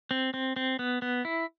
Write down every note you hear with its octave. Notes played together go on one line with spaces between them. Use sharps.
C4
C4
C4
B3
B3
E4